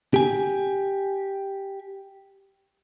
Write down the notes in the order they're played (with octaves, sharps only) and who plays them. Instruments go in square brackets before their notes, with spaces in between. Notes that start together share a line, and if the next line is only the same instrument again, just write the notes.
[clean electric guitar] G4 G#5